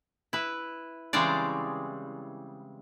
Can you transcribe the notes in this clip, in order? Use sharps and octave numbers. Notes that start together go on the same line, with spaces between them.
E4 B4
C#3 E3 G3 G#3 C4 D5